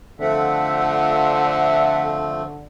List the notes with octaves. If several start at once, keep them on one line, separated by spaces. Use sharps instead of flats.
D3 F3 A3 C4 A4 E5 F#5